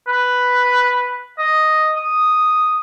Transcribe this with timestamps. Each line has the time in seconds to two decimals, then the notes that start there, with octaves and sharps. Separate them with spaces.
0.08 B4
1.39 D#5
1.96 D#6